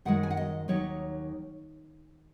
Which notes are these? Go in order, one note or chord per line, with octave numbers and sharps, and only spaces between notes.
F#2 D#3 G#3 F#5
G#5
F#5
D#5
D#2 D#3 F#3 C#5